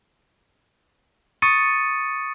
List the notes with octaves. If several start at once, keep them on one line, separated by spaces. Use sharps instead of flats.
C#6 D#6 A6 C#7 D#7